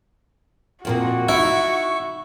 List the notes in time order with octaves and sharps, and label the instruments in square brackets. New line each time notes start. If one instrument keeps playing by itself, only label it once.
[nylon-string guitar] F2 A#2 A#3 [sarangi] F#4
[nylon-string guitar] D#4 [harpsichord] E4 [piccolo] C#6